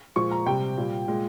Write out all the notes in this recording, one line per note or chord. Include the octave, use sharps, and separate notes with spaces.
A#2 F3 G#3 C#6
A#5
C3 G3 G5
A#2 G3
A#2 G#3